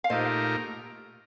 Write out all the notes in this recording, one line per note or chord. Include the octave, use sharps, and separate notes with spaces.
F5
A#2 A3 D#4 G4 A#4 C5 D#5